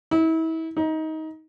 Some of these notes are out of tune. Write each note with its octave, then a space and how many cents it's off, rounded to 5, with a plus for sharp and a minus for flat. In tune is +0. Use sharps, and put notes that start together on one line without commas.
E4 -35
D#4 +20